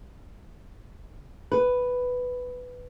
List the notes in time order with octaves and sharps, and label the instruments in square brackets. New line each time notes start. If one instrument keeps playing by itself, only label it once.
[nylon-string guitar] B4